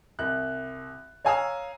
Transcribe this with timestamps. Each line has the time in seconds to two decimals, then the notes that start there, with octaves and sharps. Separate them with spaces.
0.19 C2 F#6
1.25 C#5 F5 G#5 A#5 D#6 E6